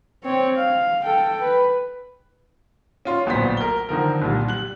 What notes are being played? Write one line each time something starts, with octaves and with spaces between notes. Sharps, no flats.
C4 C#5
F5
A4 G5
B4
C#4 F4 C6
D1 A#1 B3 C5 B6
A#4 G7
D3 D#3 F3 A#4
C2 A#2 G3
G3 F#6 F#7